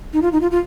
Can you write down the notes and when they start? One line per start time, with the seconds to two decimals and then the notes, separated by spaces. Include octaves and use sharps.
0.13 D#4
0.22 F4
0.32 D#4
0.41 F4
0.51 F4